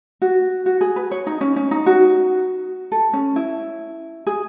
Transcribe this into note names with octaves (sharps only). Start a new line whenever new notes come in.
F#4
F#4
G#4
B4
C#5
D#4
C#4
C#4
D#4
F#4
A4
C#4
E4
G#4